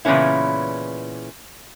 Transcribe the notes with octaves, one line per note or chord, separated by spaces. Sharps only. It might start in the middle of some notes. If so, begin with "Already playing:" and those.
A#2 C#3 E3 B3 C#4 E4